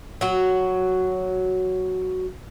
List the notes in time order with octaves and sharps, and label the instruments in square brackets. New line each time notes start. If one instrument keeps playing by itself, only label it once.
[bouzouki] F#3 F#4